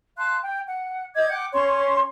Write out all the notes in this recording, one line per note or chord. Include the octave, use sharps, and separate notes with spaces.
F5 A5 C6 F#6
G5
F#5
D#5 D6 G6 G#6
F#5 G5 D6
C#4 C#5 C6 C#6